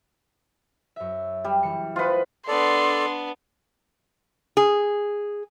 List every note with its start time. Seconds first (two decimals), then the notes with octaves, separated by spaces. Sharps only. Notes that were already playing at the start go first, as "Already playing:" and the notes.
0.96 F#2 E5
1.44 G3
1.63 E3 C#7
1.96 F4 B4 C5 D#5 F#5
2.48 B3 D4 A4 D5 C6
4.57 G#4